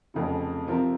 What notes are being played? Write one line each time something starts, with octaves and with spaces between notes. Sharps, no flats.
F1 F2 C#3
C3 F3 C4 F4 A#4